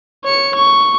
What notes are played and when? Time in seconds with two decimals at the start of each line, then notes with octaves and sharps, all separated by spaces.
0.24 C#5 C#7
0.55 C#6